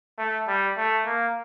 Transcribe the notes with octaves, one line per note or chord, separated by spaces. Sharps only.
A3
G3
A3
A#3